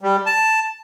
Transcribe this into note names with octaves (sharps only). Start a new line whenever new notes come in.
G3
A5